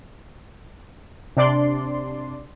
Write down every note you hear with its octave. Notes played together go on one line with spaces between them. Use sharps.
C3 D4 D5 C6